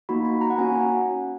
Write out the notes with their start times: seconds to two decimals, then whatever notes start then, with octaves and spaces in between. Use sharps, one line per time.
0.09 A#3 D#4 F#4 B5
0.25 B5
0.41 A#5
0.50 F#5
0.58 A#3 C#4 F#4 G#5